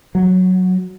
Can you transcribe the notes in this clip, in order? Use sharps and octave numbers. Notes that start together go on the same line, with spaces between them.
F#3